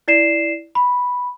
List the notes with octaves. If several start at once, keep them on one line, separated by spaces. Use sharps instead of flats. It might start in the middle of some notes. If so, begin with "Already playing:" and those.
E4 D5 C7 E7
B5